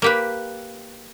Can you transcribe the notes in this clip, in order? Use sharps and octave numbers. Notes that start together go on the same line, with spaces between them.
A#3 G4 B4